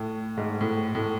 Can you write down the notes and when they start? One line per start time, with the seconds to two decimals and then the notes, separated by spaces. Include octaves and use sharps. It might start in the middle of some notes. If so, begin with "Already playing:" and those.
Already playing: A2
0.37 G#2
0.61 A2
0.95 A2